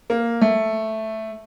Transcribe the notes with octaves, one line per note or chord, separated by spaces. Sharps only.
A#3
A3